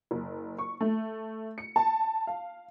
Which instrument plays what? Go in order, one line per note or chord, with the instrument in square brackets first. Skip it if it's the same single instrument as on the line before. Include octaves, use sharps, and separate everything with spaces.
[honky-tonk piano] F#1
C#6
A3
C#7
A5
F5